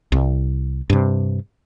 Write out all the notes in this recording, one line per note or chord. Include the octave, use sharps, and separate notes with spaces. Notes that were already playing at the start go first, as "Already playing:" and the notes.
C2
G2 C3